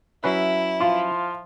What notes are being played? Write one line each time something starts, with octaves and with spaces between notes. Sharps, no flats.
F#3 C#4 E4 B4 E5
F3 F4